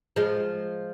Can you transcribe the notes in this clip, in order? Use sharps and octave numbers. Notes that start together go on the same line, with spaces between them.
F3 G#3